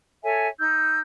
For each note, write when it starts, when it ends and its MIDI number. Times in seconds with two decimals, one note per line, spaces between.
0.24 0.48 69
0.24 0.48 73
0.24 0.48 76
0.24 0.48 80
0.59 1.00 63
0.59 1.00 88
0.59 1.00 91